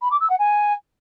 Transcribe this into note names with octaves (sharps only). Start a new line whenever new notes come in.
B5
D6
E6
F#5
G#5